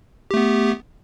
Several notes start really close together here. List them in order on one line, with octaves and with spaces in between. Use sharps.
G4 A3 B3